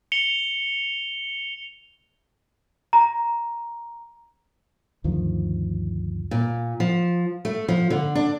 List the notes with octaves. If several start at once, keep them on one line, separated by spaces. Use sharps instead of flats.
C#7 F7 G7
A#5
D2 G2 D#3 F3
A#2
F3
A3
F3
D3
D4